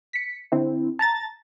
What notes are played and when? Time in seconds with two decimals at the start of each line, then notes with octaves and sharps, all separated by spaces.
0.13 B6 C#7
0.52 D3 C4 E4
0.99 A5 A#5 A6